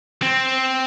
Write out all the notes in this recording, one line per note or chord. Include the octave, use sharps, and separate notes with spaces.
C4